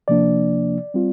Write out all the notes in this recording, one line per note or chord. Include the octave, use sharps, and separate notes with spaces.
C3 F3 A#3 D4 D5
G3 C4 F4